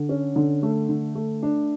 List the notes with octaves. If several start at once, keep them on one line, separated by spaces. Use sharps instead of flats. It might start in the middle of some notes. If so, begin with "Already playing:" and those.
Already playing: D3
C#4
D3
A3
D3
A3
D4